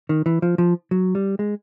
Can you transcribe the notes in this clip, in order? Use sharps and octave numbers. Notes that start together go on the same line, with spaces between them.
D#3
E3
F3
F3
F#3
G3
G#3